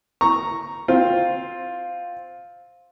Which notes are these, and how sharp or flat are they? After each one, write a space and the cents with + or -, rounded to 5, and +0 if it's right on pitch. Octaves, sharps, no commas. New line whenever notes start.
A#5 +0 C#6 +0
C4 +0 F4 +10